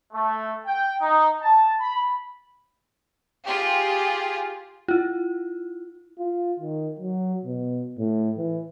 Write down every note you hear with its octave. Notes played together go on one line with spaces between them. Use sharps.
A3
G5
D#4
A5
B5
F4 G4 G#4
E4 F4
F4
D#3
F#3
B2
A2
E3